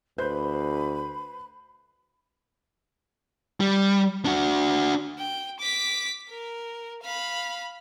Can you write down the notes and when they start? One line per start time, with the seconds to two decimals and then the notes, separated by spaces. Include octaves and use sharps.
0.18 D2 B4 C5 B5 G6
3.60 G3
4.25 D4 F#4
5.19 G5
5.60 D6 B6
6.29 A#4
7.03 F5 B5